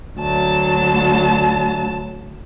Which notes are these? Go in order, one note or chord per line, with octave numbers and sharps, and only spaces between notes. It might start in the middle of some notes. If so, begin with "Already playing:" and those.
D2 F#3 A5